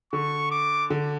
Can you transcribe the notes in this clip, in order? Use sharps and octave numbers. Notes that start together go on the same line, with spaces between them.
D3 C#6
D6
D3